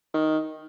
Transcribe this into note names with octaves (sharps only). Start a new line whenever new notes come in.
D#3